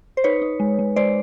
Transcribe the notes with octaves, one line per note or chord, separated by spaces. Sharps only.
C5
D#4 B4 C#5
D#4
G#3
G#3
G#3 C5 D5